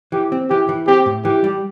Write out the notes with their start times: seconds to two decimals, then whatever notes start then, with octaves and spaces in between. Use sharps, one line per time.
0.12 E3 G4
0.32 C4
0.50 E3 G4
0.69 E3
0.87 C4 G4
1.06 A2
1.25 E3 G4
1.44 G3